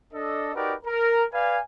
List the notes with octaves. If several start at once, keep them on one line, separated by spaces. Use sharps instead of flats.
D4 A4 D#5
D#4 F#4 G4 A#4 B4 D5
A#4
B4 D5 F5 G#5